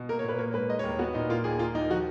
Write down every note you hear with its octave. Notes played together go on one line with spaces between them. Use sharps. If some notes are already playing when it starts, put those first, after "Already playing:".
Already playing: B2
A#3 A#4
C#5
A#2 B4
A#3 C#5
G#2 B4
G#3 D#5
C#5
D#2
A#4
B3 F#4
A#2 D#4
A#3 F4
D#2 G#4
A#3 F4
D#2 D#4
F3 F#4